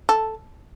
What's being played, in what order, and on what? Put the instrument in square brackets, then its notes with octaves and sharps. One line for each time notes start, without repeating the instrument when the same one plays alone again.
[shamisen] A4